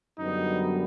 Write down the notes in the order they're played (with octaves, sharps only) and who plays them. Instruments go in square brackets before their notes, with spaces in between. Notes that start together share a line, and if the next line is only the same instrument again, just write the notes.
[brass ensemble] F#2 D3 G3 B3 D#4